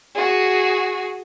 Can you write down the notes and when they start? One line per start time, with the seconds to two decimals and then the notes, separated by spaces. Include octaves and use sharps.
0.15 F#4 G#4